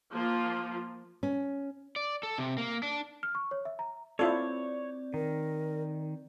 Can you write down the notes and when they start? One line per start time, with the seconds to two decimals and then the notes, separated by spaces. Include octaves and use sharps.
0.11 F3 A#3 F4
1.23 C#4
1.96 D5
2.23 A4
2.38 C3
2.58 A#3
2.83 D4
3.23 F6
3.35 C#6
3.51 C#5
3.65 E5
3.79 A#5
4.19 C4 E4 F4 A4 C#5 D5
5.14 D#3 A#4